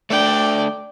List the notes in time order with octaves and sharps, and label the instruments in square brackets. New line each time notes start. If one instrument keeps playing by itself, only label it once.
[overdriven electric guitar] A3 D4 [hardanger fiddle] D5 G5